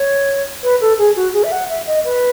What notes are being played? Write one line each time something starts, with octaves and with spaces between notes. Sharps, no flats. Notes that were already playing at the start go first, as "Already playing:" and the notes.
Already playing: C#5
B4
A4
G#4
F#4
G#4
E5
F#5
E5
D#5
B4